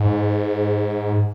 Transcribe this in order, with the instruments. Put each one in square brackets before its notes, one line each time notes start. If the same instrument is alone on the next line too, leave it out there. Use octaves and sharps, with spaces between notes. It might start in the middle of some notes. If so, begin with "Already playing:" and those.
Already playing: [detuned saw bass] G#2